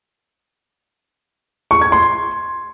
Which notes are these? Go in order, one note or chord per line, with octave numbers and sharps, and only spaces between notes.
C#6
G#6
C6